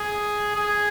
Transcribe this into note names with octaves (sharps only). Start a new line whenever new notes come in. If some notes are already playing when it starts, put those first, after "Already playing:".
Already playing: G#4
G#4